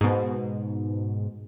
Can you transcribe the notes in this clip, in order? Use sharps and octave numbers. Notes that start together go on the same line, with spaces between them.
G#2 B2